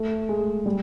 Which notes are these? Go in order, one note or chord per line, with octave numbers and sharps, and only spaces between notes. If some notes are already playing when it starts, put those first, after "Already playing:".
Already playing: A3
G#3
G3